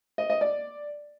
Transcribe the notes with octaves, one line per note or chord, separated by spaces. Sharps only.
D#5
D#5
D5